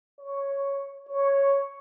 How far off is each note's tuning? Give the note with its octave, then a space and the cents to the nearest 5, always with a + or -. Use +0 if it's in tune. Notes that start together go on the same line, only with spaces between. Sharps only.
C#5 +0
C#5 +0